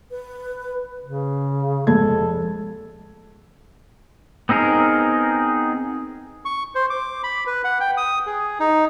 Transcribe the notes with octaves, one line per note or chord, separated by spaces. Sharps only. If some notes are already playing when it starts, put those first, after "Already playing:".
B4
C#3
F1 G#3 A4 G#6
B3 C4 D#4 G#4 A#4
C#6
C5
D6
B5
B4
F#5
G5
D#6
G#4
D#4